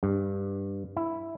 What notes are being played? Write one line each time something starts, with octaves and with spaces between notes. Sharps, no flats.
G2
E4